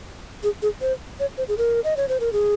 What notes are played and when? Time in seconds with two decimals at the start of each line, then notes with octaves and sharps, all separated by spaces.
0.43 G#4
0.62 G#4
0.81 C5
1.20 C#5
1.38 C5
1.48 G#4
1.58 A#4
1.84 D#5
1.97 C#5
2.08 C5
2.20 A#4
2.33 G#4